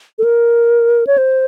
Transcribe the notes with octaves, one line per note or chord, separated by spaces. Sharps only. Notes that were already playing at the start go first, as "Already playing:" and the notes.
A4
A#4
C#5
C5